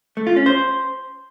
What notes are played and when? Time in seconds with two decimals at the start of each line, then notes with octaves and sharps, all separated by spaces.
0.17 A3
0.27 F4
0.36 C#4
0.46 C5